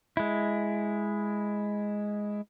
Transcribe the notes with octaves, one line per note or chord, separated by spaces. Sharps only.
G#3 E4